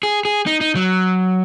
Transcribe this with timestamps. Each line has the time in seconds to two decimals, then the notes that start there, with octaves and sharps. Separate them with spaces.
0.03 G#4
0.25 G#4
0.46 D#4
0.61 D#4
0.75 F#3